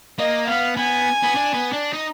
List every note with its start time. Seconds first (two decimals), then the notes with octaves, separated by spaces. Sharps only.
0.19 A#3 D#5
0.47 B3 F5
0.77 B3 G#5
1.23 B3
1.35 D4
1.54 B3
1.73 D4
1.93 D#4